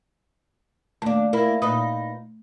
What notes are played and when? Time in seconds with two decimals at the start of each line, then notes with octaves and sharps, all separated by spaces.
1.02 D#2 A3 D4
1.33 A#3 E4
1.62 A#2 D#4 B4 D#6